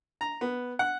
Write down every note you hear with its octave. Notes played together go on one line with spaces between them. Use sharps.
A#5
B3
F#5